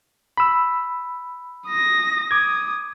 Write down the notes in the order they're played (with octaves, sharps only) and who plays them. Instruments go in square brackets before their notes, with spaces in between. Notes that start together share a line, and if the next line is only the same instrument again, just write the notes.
[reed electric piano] B5 E6
[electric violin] D#6 A#6
[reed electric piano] D6 G#6 [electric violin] D#6